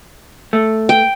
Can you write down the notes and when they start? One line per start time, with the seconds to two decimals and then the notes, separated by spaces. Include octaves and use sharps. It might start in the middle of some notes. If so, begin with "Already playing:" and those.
0.53 A3
0.89 G5